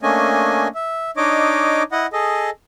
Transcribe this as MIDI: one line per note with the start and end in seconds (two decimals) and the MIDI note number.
0.03 0.68 57
0.03 0.68 58
0.03 0.68 61
0.03 0.68 62
0.03 0.68 75
0.03 0.68 80
0.75 1.11 76
1.17 1.83 62
1.17 1.83 63
1.17 1.83 73
1.17 1.83 75
1.17 1.83 86
1.92 2.06 64
1.92 2.06 75
1.92 2.06 78
2.13 2.50 68
2.13 2.50 69
2.13 2.50 75